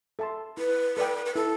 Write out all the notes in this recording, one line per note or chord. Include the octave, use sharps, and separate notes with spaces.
A4 E5 A5 C6
E4 B4
A4 B4 D5 G5
B4
E4 A4